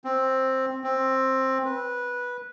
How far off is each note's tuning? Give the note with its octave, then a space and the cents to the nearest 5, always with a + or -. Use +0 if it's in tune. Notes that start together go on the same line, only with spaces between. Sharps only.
C4 +10
C4 +15
B4 -15